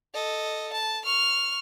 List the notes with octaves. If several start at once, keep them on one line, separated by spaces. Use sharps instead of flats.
A4 D#5
A5
C#6 F6